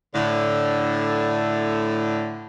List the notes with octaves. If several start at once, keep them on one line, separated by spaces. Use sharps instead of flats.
A2 D3